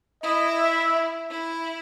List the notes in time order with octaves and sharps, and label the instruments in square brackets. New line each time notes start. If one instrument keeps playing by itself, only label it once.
[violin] E4 [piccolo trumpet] D#5
[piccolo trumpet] E5
[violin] E4